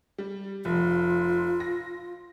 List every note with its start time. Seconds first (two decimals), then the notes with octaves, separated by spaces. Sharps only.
0.18 G3
0.65 F1 F4
1.60 A#6